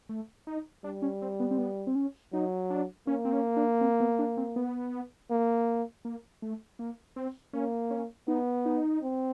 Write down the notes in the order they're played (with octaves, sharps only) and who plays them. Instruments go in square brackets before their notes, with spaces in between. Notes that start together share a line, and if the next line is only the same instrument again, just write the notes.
[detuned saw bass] A3
D#4
[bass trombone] G3 [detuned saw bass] D4
[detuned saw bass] C#4
C4
B3
C4
B3
C4
C#4
[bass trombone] F#3 [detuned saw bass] D#4
[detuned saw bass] D4
[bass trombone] A#3 [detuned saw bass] C#4
[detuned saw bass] C4
C#4
D4
C4
B3
D4
C4
B3
[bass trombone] A#3
[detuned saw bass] A#3
A3
A#3
C4
[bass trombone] A#3 [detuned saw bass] C#4
[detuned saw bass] C#4
[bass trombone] B3 [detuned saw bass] D#4
[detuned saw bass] D#4
[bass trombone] C4